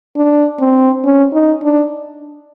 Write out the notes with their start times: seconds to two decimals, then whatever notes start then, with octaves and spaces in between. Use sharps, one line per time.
0.16 D4
0.60 C4
1.05 C#4
1.33 D#4
1.63 D4